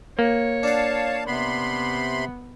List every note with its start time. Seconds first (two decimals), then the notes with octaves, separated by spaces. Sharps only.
0.19 A#3 C#5
0.63 D4 F5 F#5 A5
1.27 C3 B3 B5 C6